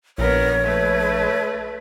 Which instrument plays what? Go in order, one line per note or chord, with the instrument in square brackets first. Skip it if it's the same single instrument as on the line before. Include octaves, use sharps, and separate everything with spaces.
[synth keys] A#1 [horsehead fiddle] B3 A#4 [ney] C#5
[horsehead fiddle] A3 B4